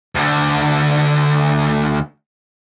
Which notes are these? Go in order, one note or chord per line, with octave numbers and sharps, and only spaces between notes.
D2 D3